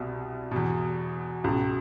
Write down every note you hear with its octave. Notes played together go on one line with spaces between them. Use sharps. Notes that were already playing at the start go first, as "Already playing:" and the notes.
Already playing: C2 B2
E2 B2
C#2 B2